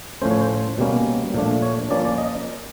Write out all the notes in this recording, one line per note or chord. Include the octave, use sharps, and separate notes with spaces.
A2 F3 A3 C#4 C5
C#5
C5
B2 G3 A#3 C#4
A#2 F3 A3 D4
C#5
F3 A#3 C#4 D5
D5
D#5